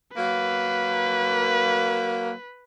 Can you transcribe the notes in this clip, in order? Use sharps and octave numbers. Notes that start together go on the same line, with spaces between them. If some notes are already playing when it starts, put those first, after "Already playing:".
F#3 A#3 B4